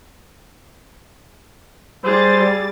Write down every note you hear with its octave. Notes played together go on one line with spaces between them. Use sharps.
G3 G#4 C5 A6